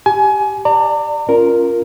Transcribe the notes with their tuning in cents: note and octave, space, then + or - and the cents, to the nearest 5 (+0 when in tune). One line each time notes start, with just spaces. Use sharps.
G4 +0 G#5 +25
D5 +10 A#5 -40
C#4 +0 F4 +0 A#4 +0